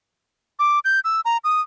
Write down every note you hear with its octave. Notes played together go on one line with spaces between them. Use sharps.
D6
G6
E6
A#5
D#6